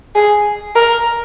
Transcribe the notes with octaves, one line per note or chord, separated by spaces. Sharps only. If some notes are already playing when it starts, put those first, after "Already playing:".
G#4
A#4